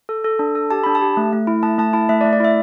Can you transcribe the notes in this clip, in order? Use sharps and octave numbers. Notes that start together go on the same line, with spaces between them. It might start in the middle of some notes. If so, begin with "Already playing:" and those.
A4
A4
D4
A4
G4 A5
D4 B5
A5
G4
A3
A3
E4
A3 A5
A3 A5
E4 A5
A3 E5
D5
A3
D5
E4 E5